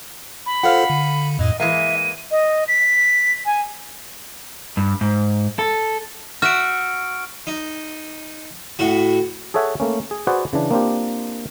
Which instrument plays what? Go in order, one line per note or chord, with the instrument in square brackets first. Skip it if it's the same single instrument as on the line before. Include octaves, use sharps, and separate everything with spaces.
[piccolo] B5
[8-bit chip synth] F4 A4 C5 [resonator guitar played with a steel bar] F5 F#5
[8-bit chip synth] D3
[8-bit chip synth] F2 A2 [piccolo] D#5
[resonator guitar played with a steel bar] E3 G#3 A#3 [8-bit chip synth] E5 [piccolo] D#7
[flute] D#5
B6
G#5
[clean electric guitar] G2
G#2
A4
[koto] F#4 E5 [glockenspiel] F6 D7
[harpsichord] D#4
A2 F#4
[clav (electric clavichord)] G#4 A4 C#5 E5 F#5 G#5
A3 A#3 C#4
G#4
F#4 G#4 B4 C5 D5 F#5
C#3 E3 D4
A#3 C4 D4 F4 G4